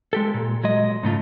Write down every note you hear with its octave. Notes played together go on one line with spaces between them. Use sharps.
G#3 G4 A4
A#2
F#3 G#3 D#5
G#2 C#3 A3 F4